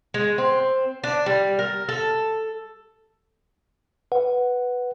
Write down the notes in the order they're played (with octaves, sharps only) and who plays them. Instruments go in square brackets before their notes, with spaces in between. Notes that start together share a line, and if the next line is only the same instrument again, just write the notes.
[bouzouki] G#3
C4
D4
G3
A#4
A4
[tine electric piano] B4 F#5